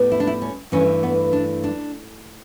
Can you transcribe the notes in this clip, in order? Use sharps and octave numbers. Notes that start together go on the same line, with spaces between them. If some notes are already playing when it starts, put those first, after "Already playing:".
Already playing: A2 G3 B3
E4
D4
E4
C#4
G2 E3 A3 C#4
B3
D4
D4